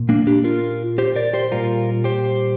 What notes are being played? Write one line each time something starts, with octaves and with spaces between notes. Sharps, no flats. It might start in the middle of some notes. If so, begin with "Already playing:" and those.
Already playing: A#2
A#3 D4
D4 G4
F4 A#4
G4 C5
A#4 D5
G4 C5
A#2 G3 F4 A#4
G4 C5